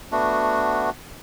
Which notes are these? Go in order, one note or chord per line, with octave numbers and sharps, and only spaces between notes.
A3 B3 D4 F#4